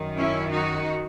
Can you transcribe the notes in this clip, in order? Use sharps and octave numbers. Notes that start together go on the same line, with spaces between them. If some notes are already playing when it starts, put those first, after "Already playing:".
Already playing: F#2 D#3
C#4 E4
D#4 F#4